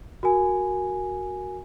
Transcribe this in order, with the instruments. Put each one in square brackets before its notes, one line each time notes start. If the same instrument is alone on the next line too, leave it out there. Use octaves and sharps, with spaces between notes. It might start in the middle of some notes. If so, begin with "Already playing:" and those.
[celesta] F#4 A#4 G#5